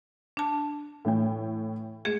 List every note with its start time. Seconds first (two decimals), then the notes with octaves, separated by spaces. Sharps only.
0.37 D4 A5
1.05 A2 E3 G5
2.05 G#3 G#4 C#7 E7